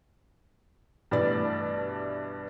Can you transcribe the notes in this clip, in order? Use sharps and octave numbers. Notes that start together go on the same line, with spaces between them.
G2 B2 E3 A3 D5 A6